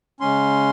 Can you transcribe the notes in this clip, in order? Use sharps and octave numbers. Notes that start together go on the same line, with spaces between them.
C#3 G#3 C#4 C6